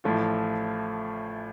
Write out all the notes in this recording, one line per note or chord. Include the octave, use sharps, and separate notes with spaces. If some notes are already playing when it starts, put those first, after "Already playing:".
A1 A2 F3 A3 F4